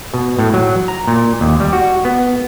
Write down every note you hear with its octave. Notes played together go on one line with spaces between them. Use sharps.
B2
A2
F#3
A#5
A#2
D#2
G3
F#4
B3